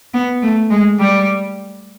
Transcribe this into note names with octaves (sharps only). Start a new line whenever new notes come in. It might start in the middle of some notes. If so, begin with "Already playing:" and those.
B3
A3
G#3
G3